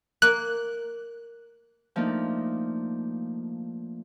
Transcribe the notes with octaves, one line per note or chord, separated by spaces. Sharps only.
A#3 F#6
F3 A3 A#3 D4 D#4